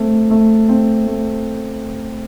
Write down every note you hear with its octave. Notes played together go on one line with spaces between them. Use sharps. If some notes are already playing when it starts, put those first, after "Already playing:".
Already playing: A3 C4
A3
C4
A3